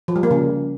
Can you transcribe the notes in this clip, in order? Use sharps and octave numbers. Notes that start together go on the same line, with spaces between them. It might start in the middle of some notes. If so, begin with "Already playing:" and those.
F3
G3
A#3
C#3